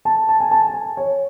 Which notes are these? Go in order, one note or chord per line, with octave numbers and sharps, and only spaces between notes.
A5
A5
G#5
A5
A5
G#5
C#5